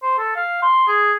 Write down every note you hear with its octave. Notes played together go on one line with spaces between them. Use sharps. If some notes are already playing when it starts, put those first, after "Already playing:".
C5
A4
F5
C6
G#4